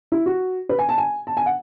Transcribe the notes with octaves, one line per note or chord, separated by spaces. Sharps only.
E4
F#4
B4
G#5
A5
G#5
A5
G#5
F#5